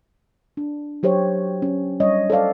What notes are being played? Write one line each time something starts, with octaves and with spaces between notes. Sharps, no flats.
D4
F#3 G4 C5 C#5
C#4
G3 D4 C#5 D#5
A4 C5 D5 F5